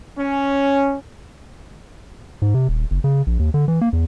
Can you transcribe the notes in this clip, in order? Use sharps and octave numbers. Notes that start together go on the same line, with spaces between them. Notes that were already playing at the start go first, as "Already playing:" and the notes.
C#4
G#2
C3
D#1
F#1
C#3
A#1
D#2
D3
E3
A#3
E2